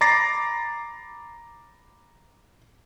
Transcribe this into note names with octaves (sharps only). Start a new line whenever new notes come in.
A#5 B5 D6 A6 A#6 C7